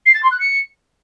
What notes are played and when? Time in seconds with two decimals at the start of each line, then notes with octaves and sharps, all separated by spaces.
0.06 C7
0.14 A6
0.23 C6
0.31 F#6
0.40 C#7